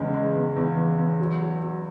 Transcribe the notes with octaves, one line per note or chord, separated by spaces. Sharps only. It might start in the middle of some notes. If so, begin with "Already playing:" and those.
Already playing: E2 C#3 G#3
G#3
E2
E2
E2
E2
F#3
F#3
F#3